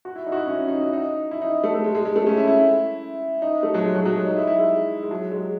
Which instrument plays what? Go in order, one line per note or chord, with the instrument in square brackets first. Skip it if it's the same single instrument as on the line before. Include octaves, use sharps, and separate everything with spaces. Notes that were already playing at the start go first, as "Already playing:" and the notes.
[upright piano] F#4
E4
D#4
F#4
E4
C#4
D#4
E4
D#4
E4
D#4
A3
A3
G#3
G#3
G#3
A3
C#4
E4
E4
D#4
A3
F#3
G#3
F#3
F#3
G#3
D#4
E4
E4
G#3
G#3
F#3
G#3